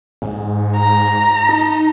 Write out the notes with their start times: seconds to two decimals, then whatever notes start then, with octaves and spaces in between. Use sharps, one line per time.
0.22 G#2
0.75 A#5
1.49 D#4